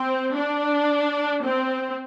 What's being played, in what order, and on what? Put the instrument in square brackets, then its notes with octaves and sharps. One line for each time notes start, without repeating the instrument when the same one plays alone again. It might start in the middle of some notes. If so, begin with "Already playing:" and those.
Already playing: [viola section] C4
D4
C4